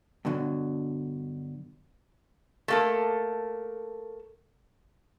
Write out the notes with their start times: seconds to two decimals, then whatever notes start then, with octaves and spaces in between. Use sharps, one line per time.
0.25 G2 B2 D3 F#3
2.68 A3 A#3 A4